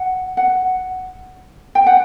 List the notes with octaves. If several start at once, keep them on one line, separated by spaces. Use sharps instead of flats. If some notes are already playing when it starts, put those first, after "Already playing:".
Already playing: F#5
F#5
G5
F#5